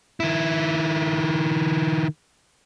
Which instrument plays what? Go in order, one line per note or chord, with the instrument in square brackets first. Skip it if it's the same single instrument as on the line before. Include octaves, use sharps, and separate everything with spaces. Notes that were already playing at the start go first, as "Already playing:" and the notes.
[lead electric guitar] D#3 E4